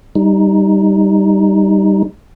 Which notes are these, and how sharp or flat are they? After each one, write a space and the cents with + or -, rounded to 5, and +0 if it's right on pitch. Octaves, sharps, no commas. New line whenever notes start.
G3 +0 D#4 +0